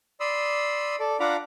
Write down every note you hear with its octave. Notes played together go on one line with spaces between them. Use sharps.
D5 B5 C6 D#6 E6
A4 D5
D4 F4 F#5 A#5 B5 D6